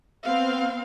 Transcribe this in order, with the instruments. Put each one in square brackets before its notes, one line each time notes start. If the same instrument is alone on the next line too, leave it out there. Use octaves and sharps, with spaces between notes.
[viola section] B3 C4 F5